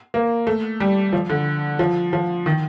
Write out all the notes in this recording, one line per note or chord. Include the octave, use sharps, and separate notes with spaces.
A#3
A3
G3
F3
D3
F3
F3
D#3